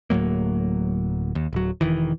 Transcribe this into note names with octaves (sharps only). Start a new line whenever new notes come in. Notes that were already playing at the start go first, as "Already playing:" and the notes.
D1 A2 F#3 A#3
D#2
D1 F#3
E1 D#3 E3